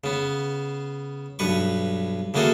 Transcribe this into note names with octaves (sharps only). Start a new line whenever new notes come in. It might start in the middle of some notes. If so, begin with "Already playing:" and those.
C#3 B3
B1 G2 B4 C#6
C#3 E3 A#3 F#4 G#4 A4